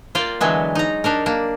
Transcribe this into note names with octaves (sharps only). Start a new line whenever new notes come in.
A#3 F4 D5 F5 G5
D3 E3 F#3 G#3 B3
D#4 A#5
D4 D#4 A#4
A#3 D4